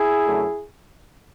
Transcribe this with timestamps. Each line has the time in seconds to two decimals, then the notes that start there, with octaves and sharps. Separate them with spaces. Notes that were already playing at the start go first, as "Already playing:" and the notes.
Already playing: E4 G#4
0.26 F#2 D3 A3